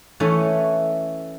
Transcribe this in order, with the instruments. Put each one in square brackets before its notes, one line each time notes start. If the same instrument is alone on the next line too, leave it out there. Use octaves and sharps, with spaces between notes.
[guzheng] E3 A3 C#4